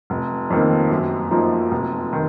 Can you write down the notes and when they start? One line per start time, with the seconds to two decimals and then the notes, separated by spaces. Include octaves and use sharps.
0.10 F1
0.50 F2 D#3 A#3
0.91 F#2
1.31 F3 A#3 D#4
1.71 F1
2.13 D#3